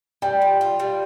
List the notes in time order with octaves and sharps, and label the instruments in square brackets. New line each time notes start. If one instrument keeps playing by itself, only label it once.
[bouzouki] G3 [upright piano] G5
[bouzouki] F4
F4
G3